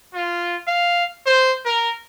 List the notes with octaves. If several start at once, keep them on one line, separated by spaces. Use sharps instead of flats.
F4
F5
C5
A#4